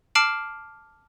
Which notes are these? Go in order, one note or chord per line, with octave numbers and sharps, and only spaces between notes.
A5 D6 F6 C7 D7 F#7